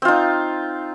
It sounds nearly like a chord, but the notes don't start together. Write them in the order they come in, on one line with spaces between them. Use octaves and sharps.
C4 F4 D#4